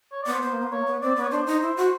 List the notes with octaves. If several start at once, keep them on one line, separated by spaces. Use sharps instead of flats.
C#5
D5
B3
C5
B3 C5
A#3
B3
A#3 C#5
B3
C4 D5
B3 C#5
D4 C5
D#4
E4
F#4